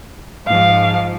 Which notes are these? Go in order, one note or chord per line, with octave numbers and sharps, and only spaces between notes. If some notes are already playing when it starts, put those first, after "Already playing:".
G#2 F3 F5